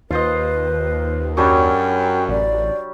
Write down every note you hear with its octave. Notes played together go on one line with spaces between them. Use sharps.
D#2 F4 B4 C5 D#5
F#2 F#3 G3 D4 G5
A1 D5